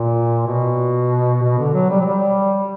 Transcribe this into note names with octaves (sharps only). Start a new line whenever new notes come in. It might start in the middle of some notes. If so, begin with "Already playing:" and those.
Already playing: A#2
B2
B2
D3
F#3
G3
F#3
G3